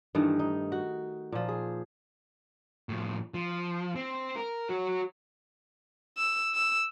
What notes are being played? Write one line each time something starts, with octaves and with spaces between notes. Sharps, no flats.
G2 D#3 E3 A3
D#4
F#4
A#2 F3
G#4
A2 F3
F3
C4
A#4
F#4 C#5
E6
E6